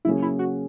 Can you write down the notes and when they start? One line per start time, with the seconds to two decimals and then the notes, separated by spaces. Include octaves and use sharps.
0.05 C#3 F#3 A#3 C#4 E4 G#4
0.22 E4
0.39 F#4